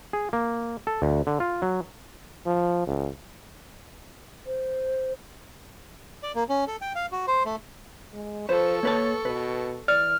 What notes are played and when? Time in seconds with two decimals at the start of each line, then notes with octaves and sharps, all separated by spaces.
0.13 G#4
0.33 A#3
0.87 A4
1.02 D2
1.27 D3
1.40 F4
1.62 F#3
2.46 F3
2.87 C#2
4.47 C5
6.23 D5
6.35 A#3
6.49 C#4
6.68 A4
6.82 G5
6.95 F5
7.12 F#4
7.27 C5
7.45 A3
8.14 G#3
8.49 F3 A4 B4 C5 C#6
8.83 A#3 B4 C#5 A5
9.25 B2 B4
9.88 E3 D5 F6